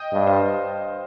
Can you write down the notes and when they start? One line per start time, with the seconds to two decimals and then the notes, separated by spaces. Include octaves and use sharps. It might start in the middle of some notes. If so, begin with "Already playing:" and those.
Already playing: D#5 G5
0.13 G2
0.27 C5 F5